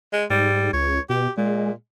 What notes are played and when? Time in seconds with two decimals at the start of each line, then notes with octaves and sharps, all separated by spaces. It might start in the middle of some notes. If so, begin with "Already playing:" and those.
0.13 G#3
0.30 G#2 G3
0.73 C#2 C#5
1.09 B2 G4
1.37 A#2 G#3